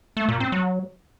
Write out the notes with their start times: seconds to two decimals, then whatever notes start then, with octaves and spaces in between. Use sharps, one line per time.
0.17 A3
0.28 A#2
0.40 C4
0.52 F#3